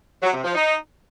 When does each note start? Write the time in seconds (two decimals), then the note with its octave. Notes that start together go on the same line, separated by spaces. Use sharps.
0.23 F#3
0.33 C3
0.44 F3
0.55 D#4